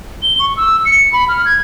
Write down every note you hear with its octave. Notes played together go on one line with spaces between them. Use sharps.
G7
C#6
E6
C#7
B5
F6
G#6